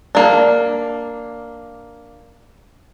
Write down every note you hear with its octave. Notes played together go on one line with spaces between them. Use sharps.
A#3 D4